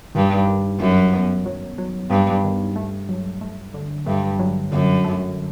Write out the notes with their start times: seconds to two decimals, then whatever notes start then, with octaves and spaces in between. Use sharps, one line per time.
0.15 G2 D#3
0.47 D#3
0.80 F#2 D#3
1.13 B3
1.46 F#3
1.78 F#3
2.10 G2 B3
2.44 D#3
2.76 A3
3.09 F#3
3.41 A3
3.74 D3
4.06 G2 A3
4.39 F#3
4.72 F#2 D3
5.04 A3